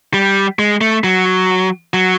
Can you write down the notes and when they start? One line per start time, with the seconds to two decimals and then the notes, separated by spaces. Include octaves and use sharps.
0.14 G3
0.59 G#3
0.81 A3
1.04 F#3
1.94 F#3